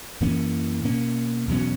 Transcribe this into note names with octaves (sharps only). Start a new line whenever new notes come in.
F#2 E3 A#3 C#4
B2 A#3 C#4
E2 B2 F#3 C#4